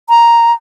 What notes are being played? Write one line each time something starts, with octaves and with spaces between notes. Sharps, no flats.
A#5